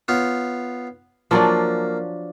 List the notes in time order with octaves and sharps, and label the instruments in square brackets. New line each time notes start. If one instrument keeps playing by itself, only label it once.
[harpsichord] B3 F4 C#5
[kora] F3 F#3 D4 [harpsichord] A#3